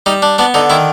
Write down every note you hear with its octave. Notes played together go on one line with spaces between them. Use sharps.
G3 D#4
D4
B3 D4
D3 D#4
D#3 E4